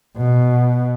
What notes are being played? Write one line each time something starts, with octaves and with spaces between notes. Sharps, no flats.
B2